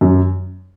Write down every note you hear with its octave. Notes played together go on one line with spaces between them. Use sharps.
F#2